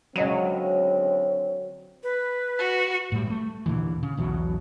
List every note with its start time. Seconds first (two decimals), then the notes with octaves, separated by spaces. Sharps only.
0.16 C#2 D3 F#3 C4 C#5 D#5 D#7
2.03 B4
2.59 F#4
3.12 A2 G3
3.27 G#3 A3
3.66 D#2 A#2 D3 E3
4.03 C#3
4.17 B1 E2 B2 F#3